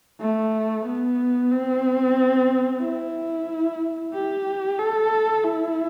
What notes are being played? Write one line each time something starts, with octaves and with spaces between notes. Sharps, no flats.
A3
B3
C4
E4
G4
A4
E4